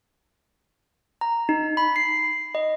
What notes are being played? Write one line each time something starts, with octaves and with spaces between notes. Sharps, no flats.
A#5
D#4
B5
C7
D#5